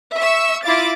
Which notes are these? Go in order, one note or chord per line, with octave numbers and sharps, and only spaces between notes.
E5 C#6 E6
E4 F4 D6 A6